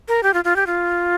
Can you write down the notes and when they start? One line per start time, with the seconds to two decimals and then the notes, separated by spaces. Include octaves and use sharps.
0.08 A#4
0.23 G4
0.34 F4
0.44 F4
0.56 G4
0.67 F4